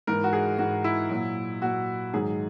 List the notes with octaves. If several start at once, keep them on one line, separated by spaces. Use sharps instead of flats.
G#2 E3 A#4
F#4
G#4
G#2 E3 F#4
E4
A#2 F#3
A#2 F#3 F#4
G#2 D#3 F#3 G#4